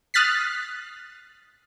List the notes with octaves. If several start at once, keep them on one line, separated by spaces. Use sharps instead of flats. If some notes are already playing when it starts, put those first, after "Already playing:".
D#6 F6 F#6 A6 B6 C7